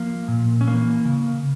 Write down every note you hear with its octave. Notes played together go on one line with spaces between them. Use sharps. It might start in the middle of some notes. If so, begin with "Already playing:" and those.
Already playing: F3 A#3
A#2
C#4
E3 A#3
C#3